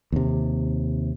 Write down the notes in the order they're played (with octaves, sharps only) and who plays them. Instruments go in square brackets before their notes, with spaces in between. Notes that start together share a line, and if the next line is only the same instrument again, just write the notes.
[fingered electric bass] D#2 C3